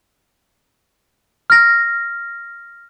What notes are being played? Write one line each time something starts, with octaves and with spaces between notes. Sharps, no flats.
F6 A#6